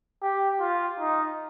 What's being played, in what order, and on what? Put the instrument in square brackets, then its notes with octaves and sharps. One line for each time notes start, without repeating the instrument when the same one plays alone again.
[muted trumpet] G4
F4
D#4